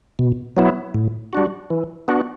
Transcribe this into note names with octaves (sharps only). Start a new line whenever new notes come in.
B2
F#3 B3 E4
A2
G3 D4 F#4
E3
B3 D4 F#4